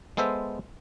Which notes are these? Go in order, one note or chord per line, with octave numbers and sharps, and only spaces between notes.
G#3 B3 A4 C5 E5